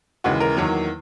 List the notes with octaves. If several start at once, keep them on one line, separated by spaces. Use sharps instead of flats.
D#2 C#3 E3 G#3 F#4
A#4
E2 D#3 F#3 A#3